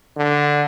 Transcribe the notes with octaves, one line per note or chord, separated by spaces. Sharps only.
D3